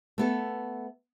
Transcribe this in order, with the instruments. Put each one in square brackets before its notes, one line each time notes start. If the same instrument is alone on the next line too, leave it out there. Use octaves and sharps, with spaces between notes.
[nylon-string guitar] A3 B3 A4